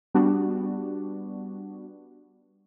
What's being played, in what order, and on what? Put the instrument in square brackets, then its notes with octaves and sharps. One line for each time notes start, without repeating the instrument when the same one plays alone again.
[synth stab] G3 B3 D4 F#4